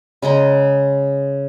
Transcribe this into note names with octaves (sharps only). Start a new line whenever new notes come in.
C#3 G#3 D#5 A#5